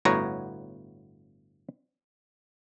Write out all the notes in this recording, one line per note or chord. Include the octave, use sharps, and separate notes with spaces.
G1 A2 B3 F#4 C#5 A#5